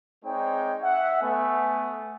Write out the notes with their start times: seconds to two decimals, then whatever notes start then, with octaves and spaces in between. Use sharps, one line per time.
0.24 G#3 C4 D#4 C#5 D5 G5
0.82 E5 F#5
1.22 A3 B3 G#5